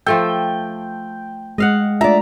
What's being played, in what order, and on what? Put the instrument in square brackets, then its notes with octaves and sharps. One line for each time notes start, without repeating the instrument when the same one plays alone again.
[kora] F3 A3 A4 [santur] G5
[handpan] G#3 [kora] D#5 F5 F#5
[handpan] A3 D4 F4 [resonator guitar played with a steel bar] D5 E5 [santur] A#5